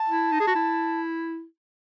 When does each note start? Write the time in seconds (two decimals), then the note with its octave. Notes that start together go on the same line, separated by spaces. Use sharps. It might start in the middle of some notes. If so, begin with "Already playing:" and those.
Already playing: A5
0.09 E4
0.32 D#4
0.40 G#4
0.47 F#4
0.55 E4